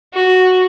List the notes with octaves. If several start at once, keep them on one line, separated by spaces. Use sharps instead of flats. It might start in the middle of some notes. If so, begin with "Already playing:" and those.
F#4